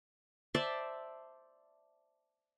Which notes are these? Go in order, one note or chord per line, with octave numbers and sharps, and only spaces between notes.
C5 D5 E5 A5